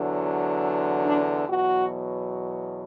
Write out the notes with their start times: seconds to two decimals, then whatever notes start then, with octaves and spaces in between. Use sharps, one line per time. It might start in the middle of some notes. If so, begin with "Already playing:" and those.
Already playing: E2 D3 F#3
1.06 D4
1.47 E2 B2 F#3 F#4